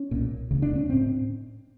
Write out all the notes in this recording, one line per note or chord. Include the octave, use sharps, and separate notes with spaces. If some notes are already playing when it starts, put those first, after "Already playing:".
Already playing: C#4
B1 A#2
E1 D2 C#3
D4
C#4
A2 C4